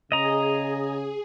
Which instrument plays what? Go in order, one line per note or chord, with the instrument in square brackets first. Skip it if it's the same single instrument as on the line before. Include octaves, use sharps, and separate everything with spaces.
[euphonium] C#3 [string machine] G#4 [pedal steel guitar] D#5 A#5